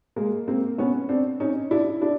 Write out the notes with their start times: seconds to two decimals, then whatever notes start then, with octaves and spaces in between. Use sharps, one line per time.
0.16 G#3 A#3
0.48 A#3 C4
0.78 B3 C#4
1.09 C4 D4
1.40 C#4 D#4
1.71 D4 E4
2.01 D4 E4